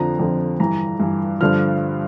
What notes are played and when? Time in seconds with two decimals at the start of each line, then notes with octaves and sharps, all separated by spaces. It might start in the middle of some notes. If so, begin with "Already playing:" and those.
Already playing: F2 D3 F3 A#5
0.19 F2 D3 F3
0.59 G2 E3 A#5
1.00 G2 E3
1.41 G2 D3 F3 F6